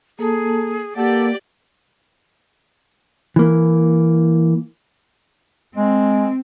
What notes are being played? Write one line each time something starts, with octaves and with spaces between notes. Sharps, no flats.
A#3 G#4 A4 A5
A#3 G4 A4 D5 F#5
E3 A#3
G#3 C4